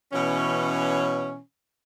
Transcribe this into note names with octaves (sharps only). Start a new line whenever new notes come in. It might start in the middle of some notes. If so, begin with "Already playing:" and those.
B2 E3 C#4